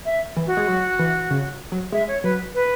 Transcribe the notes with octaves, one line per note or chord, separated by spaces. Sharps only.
E5
E3
F#4
G#3
F#3
E3
C#3
F#3
G#3 E5
C#5
F#3 B4
B4